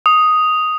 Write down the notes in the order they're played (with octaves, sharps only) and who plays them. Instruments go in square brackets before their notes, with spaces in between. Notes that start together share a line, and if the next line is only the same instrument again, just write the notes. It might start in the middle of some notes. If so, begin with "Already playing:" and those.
[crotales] D#6